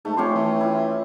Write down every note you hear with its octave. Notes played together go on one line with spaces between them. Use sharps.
G#2 A3
F2 C#4 G4 C6
E3
E4 F4